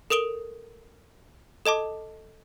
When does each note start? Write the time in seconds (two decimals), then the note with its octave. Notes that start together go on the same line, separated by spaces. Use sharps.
0.10 A4 A#4 D#6 D7 G7
1.66 A4 D#5 A5 D6